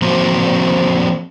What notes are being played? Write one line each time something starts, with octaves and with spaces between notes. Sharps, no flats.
F3 A#3 C4 F4 F#4